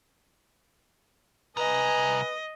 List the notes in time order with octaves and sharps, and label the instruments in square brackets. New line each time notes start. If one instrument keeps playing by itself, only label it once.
[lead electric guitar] C2 A#5 [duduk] B4 [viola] D#5 [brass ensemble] G#5